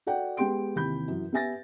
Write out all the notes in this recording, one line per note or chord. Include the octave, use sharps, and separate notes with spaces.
F#4 A4 D5 F#5 G5
G#3 B3 G4 G5 C6 D7
D#2 C3 E3 B5 G6
F#2 E3
B3 G4 E5 G#5 A6 A#6